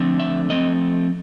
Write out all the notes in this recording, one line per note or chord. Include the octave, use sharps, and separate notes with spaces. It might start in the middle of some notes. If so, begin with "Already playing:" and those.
Already playing: D3 F3 A3 C4
E5
F3 A3 C4 D#5